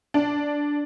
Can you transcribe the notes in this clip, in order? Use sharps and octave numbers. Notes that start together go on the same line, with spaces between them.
D4